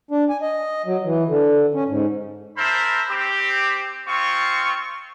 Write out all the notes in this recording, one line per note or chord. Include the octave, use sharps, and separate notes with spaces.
D4
G#5
D#5
F#3
E3
D3
C#4
G#2
E4 A#4 C5 E5 A5 B5
C4 G4
G#3 C4 F4 C#6